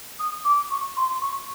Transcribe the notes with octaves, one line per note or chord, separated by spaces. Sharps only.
D#6
D6
C#6
C6
C#6